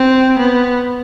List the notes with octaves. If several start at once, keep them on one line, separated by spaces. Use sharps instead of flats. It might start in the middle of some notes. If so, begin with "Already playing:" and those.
Already playing: C4
B3